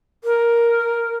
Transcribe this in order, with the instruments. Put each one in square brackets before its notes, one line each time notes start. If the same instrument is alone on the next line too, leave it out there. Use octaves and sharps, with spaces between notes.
[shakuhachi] A#4